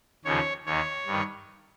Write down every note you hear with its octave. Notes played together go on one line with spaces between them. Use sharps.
D#2 C#3 F3 C#5
D#2 D#3 C#5
G2 D#3